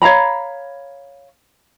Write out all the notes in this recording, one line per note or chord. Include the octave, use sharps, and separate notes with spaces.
C#5 F5 A#5 B5